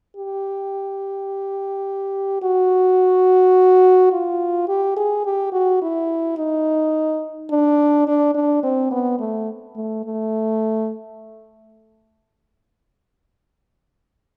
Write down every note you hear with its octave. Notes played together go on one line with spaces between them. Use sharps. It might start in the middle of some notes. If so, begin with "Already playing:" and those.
G4
F#4
F4
G4
G#4
G4
F#4
E4
D#4
D4
D4
D4
C4
B3
A3
A3
A3